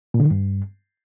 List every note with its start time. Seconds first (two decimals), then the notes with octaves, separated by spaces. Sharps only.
0.14 A#2
0.20 D3
0.25 D#3
0.31 G2